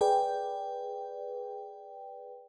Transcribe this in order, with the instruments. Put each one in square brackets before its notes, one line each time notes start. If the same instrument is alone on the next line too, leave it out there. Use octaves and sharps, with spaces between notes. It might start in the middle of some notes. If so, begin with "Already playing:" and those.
[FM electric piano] G#4 B4 D5 G5